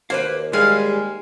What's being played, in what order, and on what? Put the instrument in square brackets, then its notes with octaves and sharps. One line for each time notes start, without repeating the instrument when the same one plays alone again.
[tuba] D#2 [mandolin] A#3 [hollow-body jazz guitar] B4 C5 F5
[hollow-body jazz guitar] G3 [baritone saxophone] G#3 [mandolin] F5 G#5 F6